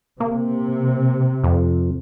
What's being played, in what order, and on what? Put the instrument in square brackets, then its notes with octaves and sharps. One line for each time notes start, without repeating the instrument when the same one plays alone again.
[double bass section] C3 [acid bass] A#3
[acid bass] F2